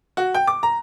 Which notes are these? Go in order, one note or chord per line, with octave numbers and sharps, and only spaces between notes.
F#4
G5
D6
A#5